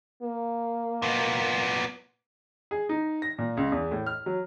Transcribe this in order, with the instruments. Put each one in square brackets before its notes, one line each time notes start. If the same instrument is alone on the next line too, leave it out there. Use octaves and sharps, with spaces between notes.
[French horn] A#3
[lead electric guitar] A#2 B3
[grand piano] G#4
D#4
A#6
A#2
C#2
E2
A2
F6
F#3